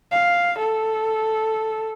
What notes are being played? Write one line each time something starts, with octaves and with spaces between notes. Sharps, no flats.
F5
A4